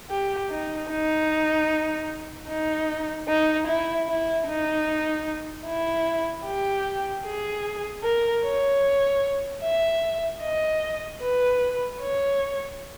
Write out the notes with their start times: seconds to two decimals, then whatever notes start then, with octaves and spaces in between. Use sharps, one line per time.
0.10 G4
0.51 D#4
0.90 D#4
2.48 D#4
3.28 D#4
3.67 E4
4.08 E4
4.47 D#4
5.66 E4
6.45 G4
7.25 G#4
8.03 A#4
8.43 C#5
9.63 E5
10.42 D#5
11.22 B4
12.01 C#5